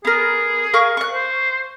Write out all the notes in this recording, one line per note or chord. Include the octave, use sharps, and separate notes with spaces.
B3 G#4 A#4
A#4 F5 C#6
C#6 F#6
C5